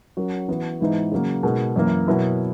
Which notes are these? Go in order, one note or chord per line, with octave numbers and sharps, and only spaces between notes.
F#3 C#4 F#4 A#4
E3 B3 F#4
G#2 E3 B3 D#4
C#3 F#3 A#3
B2 G#3 D#4 A#4
F#2 E3 A#3
B2 F#3 B3 E4 A#4